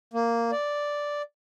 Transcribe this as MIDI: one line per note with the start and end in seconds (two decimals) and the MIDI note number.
0.13 0.51 58
0.51 1.22 74